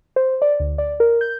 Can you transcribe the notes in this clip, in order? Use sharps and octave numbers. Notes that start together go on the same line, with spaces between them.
C5
D5
D2
D5
A#4
G6